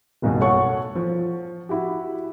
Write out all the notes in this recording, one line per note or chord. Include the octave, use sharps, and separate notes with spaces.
F#1 B1 G2 B2
A4 C#5 F#5 C#6
F3
E4 F#4 G4